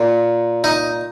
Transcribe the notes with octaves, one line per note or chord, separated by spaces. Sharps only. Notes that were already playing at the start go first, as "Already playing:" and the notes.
Already playing: A#2
D#4